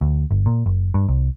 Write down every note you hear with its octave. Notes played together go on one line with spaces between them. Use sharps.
D2
G1
A#2
F#1
G2
C2